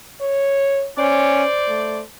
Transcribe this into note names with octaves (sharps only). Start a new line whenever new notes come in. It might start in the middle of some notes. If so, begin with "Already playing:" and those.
C#5
C#4 C5 D5
A3